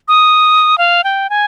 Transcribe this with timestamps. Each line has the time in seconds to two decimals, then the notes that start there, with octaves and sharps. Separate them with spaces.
0.08 D#6
0.78 F5
1.04 G5
1.30 G#5